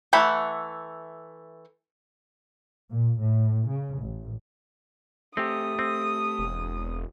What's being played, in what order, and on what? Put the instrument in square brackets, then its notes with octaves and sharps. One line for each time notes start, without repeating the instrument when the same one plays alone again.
[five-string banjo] E3 A3 E5 F#5 B5
[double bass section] A#2
A2
C#3
A1
[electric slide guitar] A3 G4 [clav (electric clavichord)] C4 [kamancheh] D#6
[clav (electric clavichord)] C4
[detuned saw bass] E1